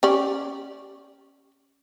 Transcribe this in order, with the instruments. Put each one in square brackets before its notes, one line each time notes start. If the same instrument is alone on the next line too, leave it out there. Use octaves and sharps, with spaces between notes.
[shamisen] C#4 G4 D5